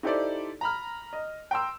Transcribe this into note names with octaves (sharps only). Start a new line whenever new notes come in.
D#4 E4 G4 A4 C5 D5
A#5 B5 F6
D#5
G5 A#5 C6 E6